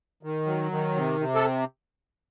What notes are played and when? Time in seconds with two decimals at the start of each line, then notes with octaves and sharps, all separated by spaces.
0.23 D#3
0.46 F#3
0.71 D#3
0.95 C3
1.20 C3
1.35 A4